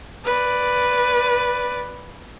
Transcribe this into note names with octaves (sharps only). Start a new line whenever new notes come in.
B4 D5